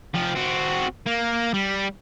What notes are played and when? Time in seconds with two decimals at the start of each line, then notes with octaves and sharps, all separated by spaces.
0.14 F3 G4
0.35 C4 F#4
1.06 A#3
1.54 G3